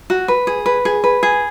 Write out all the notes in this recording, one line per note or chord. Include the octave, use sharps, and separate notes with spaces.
F#4
B4
G#4
B4
G#4
B4
G#4